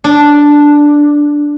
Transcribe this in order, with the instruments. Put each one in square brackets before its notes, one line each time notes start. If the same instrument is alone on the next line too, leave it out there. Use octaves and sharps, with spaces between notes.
[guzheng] D4